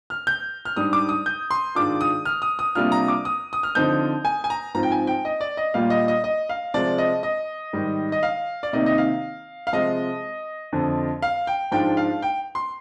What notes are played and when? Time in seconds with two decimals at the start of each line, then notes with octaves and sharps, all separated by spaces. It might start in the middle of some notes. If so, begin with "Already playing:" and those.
0.10 F6
0.27 G6
0.65 F6
0.76 G#2 G3 D4 D#6
0.93 D6
1.09 D#6
1.26 G6
1.51 C6
1.75 G#2 D#3 G#3 D4 F4 D6
2.01 D#6
2.25 F6
2.42 D#6
2.59 D#6
2.75 C3 G3 A#3 D4 F4 F6
2.92 A#5
3.08 D6
3.25 D#6
3.53 D#6
3.63 F6
3.75 D3 F3 C4 D#4 G6
4.25 G#5
4.44 G#5
4.50 A#5
4.74 G#2 F3 C4 F4 A#5
4.83 G5
4.92 G#5
5.07 G5
5.25 D#5
5.41 D5
5.57 D#5
5.74 A#2 G3 A#3 F4 F5
5.90 D#5
6.08 D#5
6.24 D#5
6.49 F5
6.74 C3 F3 G#3 D5
6.98 D#5
7.23 D#5
7.73 G#2 D#3 G3
8.12 D#5
8.23 F5
8.63 D5
8.73 C3 D#3 A#3 D#4 D#5
8.86 D#5
8.98 F5
9.67 F5
9.73 C3 F3 G#3 D#5
10.73 F2 D3 F3
11.22 F5
11.47 G5
11.71 G#2 F3 G#3 D4 F4 G5
11.97 F5
12.22 G5
12.55 C6